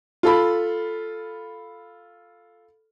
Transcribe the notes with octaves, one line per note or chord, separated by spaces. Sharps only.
F4 A4 B5